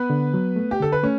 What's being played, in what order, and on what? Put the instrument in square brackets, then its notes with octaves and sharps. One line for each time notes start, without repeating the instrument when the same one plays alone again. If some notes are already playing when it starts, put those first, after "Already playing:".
Already playing: [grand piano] B3 B4
[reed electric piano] D3
F#3
A3
[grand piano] G4
[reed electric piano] D3 [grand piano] A4
[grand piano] B4
[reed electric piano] A3 [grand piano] C#4